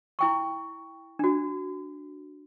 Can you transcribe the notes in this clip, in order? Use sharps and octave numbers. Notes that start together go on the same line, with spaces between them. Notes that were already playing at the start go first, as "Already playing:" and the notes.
E4 G5 C#6
D4 F#4